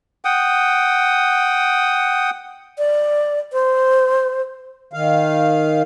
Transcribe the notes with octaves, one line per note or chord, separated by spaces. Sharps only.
F#5 G5 D#6
D5
C5
D#3 F5